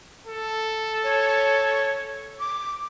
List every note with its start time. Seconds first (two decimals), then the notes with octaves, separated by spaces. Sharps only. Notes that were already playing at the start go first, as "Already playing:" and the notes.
0.27 A4
1.04 C#5
2.40 D6